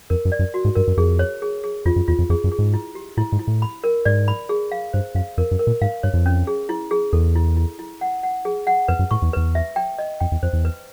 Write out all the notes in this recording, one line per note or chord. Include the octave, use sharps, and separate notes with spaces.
F2 A#4
F#2
D5
F#2
F#4
G#2
G2 A#4
F#2
F2 G#4
C#5
G#4
G#4
F2 F4
F#2
E2 F4
F2
F2 G#4
F#2
G#4
G#2
E4
G4
A2 E4
G#2
E4
A2
B5
A#4
G#2 D5
B5
G#4
F5
G2 C5
F#2 F5
F2 A#4
F#2
A#4
A#2
G#2 F5
G2 C#5
F2
C#4
G#4
E4
G#4
E2 A4
E4
E4
E4
F#5
F#5
G#4
F#5
F2 B4
F#2
A2 C#6
E2
E2 B4
E5
G5
D#5
F2 G5
E2
F2 C5
E2
B4